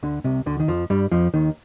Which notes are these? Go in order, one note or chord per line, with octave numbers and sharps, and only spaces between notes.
D2 D3
C2 C3
D2 D3
D#3
F2 F3
G2 G3
F2 F3
D#2 D#3